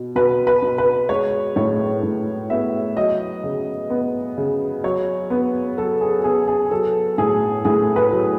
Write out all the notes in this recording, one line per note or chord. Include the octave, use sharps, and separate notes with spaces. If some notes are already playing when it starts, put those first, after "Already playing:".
Already playing: B2
B2 B4
B4
B2
B4
G#3 C#5
A2 C#5
A2
B3 E5
F#3 D#5
C#3
B3
C#3
F#3 C#5
B3
F#3 A4
G#4
B3 G#4
G#4
F#3 A4
A2 G#4
A2 G#4
B4
F#3